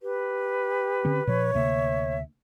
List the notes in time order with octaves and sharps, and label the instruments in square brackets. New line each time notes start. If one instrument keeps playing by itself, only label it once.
[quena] G4 [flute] B4
[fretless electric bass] D3 C4 C#4
[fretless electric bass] A#2 F3 [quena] C#5
[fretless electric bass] D2 C3 A#3 [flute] E5